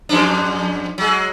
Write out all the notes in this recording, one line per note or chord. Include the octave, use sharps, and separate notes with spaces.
F2 G#2 D4
F#3 G#3